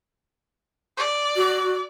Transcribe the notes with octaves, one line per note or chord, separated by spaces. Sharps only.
D5
F#4